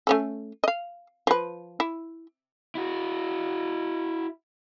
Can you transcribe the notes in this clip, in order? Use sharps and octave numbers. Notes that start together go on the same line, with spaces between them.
A3 C#4 A4
D#5 F5
F3 B4
E4
E4 F#4